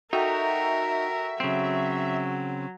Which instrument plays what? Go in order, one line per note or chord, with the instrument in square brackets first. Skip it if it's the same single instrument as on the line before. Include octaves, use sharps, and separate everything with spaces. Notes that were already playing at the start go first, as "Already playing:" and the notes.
[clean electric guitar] D#4 [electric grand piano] F#4 A4 G5 [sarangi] A#4 [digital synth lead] E5
[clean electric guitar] C#3 C4 [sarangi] F#3